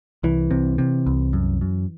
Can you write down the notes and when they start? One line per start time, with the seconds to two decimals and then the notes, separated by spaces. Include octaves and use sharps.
0.23 C2 E3
0.51 C3
0.78 C3
1.06 C2
1.33 F#2
1.61 F#2